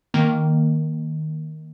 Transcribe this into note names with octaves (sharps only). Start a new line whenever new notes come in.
D#3 A#3